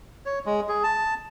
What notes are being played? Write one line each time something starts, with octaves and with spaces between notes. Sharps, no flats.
C#5
G#3
G#4
A5